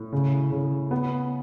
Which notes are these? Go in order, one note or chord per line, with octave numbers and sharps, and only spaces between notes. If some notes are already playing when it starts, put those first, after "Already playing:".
Already playing: A2
C#3
C#3
B3